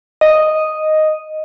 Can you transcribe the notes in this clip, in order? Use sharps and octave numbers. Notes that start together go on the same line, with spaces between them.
D#5